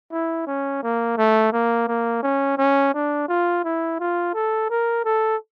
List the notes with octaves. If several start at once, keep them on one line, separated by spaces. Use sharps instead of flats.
E4
C#4
A#3
A3
A#3
A#3
C#4
C#4
D4
F4
E4
F4
A4
A#4
A4